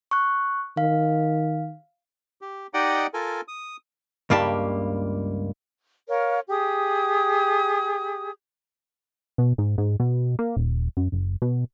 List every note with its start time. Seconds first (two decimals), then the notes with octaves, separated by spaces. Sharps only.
0.11 C#6 F#6
0.77 D#3 F5
2.41 G4
2.74 D#4 G4 D5 D#5 F#5 G5
3.14 F4 A4 A#4 G#5
3.48 D#6
4.30 C#2 G2 A#3 G4 A5
6.08 A#4 C#5 F5
6.49 G4 G#4 D#6
9.38 B2
9.58 G#2
9.78 G#2
10.00 B2
10.39 A#3
10.57 D#1
10.97 F#2
11.12 F#1
11.42 B2